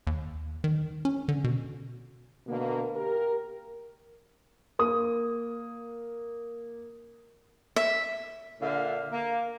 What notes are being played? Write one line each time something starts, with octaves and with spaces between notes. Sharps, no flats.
D#2
D#3
C#4
D3
B2
B2 D3 A#3
G4 A#4
A#3 D#6
E5
A#2 D3 A4 E5 F5
A#3